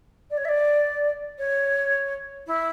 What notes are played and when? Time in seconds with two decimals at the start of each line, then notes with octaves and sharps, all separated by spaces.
0.30 D5
0.37 C#5
0.45 E5
0.48 D5
1.38 C#5
2.46 E4